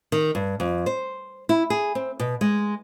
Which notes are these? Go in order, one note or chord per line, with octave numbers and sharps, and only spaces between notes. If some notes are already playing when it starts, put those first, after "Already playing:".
D#3
G2
F2
C5
E4
G#4
C4
B2
G#3